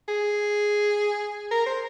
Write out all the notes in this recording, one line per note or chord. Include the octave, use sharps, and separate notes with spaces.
G#4
A#4
C5